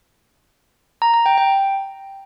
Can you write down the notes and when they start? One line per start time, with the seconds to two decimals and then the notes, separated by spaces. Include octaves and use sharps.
1.02 A#5
1.14 A#5
1.26 G5
1.38 G5